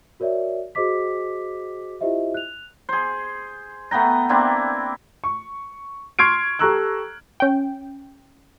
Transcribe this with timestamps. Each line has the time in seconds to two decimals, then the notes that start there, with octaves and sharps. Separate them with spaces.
0.20 F#4 A#4 C#5 D5 E5
0.75 F#4 G#4 C5 D#5 D6 B6
2.01 E4 F4 G4 C5 D#5 E5
2.34 F#6 F7
2.89 G#4 C5
3.91 A3 B3 G5 A#5
4.29 A#3 C4 D4 E4
5.24 C#6
6.19 C6 C#6 F6 G#6 C7 D7
6.59 G4 A4 A#5 C#6 E6 F#6
7.40 C#4 G5